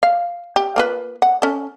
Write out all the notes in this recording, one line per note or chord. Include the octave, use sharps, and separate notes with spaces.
F5
G4
A#3 F4 B4
F#5
C#4 A4